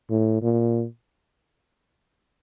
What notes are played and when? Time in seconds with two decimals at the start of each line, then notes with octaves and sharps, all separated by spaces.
0.10 A2
0.42 A#2